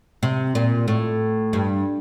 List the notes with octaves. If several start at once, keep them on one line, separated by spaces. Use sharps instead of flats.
C3
A#2
A2
G2